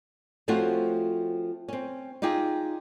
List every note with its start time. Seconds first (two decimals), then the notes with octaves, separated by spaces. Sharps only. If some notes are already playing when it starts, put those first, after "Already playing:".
0.48 F3 A3 C4 C#4 F4 F#4
1.68 C4 C#4
2.22 D#4 F4 G4 G#4